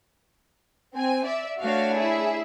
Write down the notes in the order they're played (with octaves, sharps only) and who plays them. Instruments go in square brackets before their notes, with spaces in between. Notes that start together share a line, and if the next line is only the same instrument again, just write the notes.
[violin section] C4 G#5
D5 E5
[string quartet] A3 D4 C#5 [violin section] F#4 F5
[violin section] E4 G#4 E5